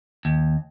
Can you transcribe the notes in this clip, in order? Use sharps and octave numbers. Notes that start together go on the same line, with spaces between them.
D#2